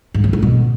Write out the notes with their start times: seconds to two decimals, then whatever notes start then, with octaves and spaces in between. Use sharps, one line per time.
0.14 G#2
0.24 C#3
0.33 A2
0.42 B2